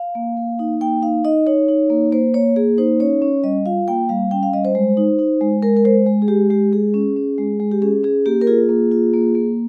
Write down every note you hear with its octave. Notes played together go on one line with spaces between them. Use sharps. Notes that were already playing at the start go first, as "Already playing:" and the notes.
Already playing: F5
A#3
A#3
D#4
A#3 G5
D#4 F5
D#4 D#5
D#4 C#5
D#4
A#3
A#3 C5
A#3 C#5
A#3 G#4
D#4 C5
C#4 C#5
C#4
G3 D#5
F4 F5
A#3 G5
G3 F5
C#4 G5
F5
G3 D#5
C5
G#3
D#4
D#4
G#3
G#3 A#4
A#4
G#3 C5
G#3
G#4
G#3 G4
G#3 G4
G#3 G#4
C#4
C#4
G#3
G#3
G4
C#4 G#4
C#4 G#4
A#3 G4
A#4
F4 G#4
A#3
F4
A#3
A#3